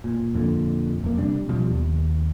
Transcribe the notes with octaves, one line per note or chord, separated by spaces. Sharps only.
A#2
F2 A#2 D3
F2 A#3
C3 G3 D4
B2 F3 G3
D#2